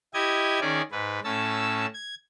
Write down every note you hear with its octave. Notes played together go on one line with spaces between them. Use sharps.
E4 G4 D#5 G#6
D#3 C#4 G#4 D5
G#2 B4
A2 C#4 A5 E6
G#6